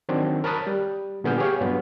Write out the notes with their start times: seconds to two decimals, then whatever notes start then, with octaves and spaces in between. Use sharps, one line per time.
0.09 D#3 F#3 C4 D4
0.44 A#4 C#5 A5 B5 D#6 F#6
0.67 G3
1.24 A#2 D3 B3 G#4 F6 G6
1.38 G4 G#4 C#5 F5
1.61 G2 F#3 B3